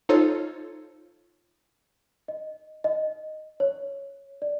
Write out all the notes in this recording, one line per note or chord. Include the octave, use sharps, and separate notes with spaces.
D#4 F4 A4 C5 C#5
D#5
D#5
C#5
D5